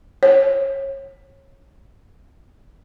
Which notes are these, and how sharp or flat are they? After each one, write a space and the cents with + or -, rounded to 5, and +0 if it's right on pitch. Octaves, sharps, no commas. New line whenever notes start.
C#5 -25